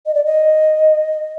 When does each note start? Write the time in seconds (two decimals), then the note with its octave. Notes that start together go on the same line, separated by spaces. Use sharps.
0.06 D#5
0.15 D5
0.25 D#5